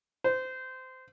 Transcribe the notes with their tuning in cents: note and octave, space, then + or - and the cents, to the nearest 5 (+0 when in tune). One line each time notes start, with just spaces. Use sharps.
C5 -20